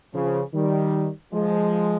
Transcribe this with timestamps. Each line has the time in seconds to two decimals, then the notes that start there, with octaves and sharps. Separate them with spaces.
0.14 C#3 F3
0.54 D#3 G3
1.33 F3 G#3